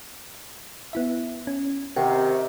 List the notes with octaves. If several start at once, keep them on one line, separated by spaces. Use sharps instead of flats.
B3 E4 E5
C#4
C3 D#3 F#5 G5